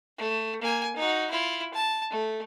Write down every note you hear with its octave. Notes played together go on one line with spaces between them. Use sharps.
A3
A#3 G#5
D#4 F#4
E4 F4
A5
A3